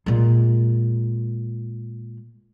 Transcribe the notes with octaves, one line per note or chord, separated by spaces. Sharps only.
A#2 G#3